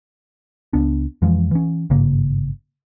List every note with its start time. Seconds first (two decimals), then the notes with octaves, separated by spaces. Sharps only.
0.73 C#2 B3 D4
1.22 F2 E3 F3 G#3
1.51 E3 C#4
1.90 G#1 G2 C#3 A#3